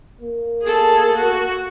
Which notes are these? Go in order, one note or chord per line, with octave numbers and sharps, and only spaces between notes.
A#3
G#4 A4
F#4